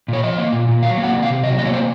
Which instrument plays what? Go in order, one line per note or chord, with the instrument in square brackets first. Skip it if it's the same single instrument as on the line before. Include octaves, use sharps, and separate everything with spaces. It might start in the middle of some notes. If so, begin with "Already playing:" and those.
[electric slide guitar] A#2 C#5
F3 D#5
A#3
A#2
A#2
F#3 F5
A#3
F#5
C3
F5
C3
F#3 D#5
A#3 D#5
C#5
C3 C5